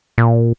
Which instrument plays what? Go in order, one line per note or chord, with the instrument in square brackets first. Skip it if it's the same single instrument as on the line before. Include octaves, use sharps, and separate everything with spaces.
[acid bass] A#2